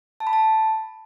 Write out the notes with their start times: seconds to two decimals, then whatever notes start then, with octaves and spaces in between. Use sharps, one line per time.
0.20 A5
0.27 B5
0.33 A5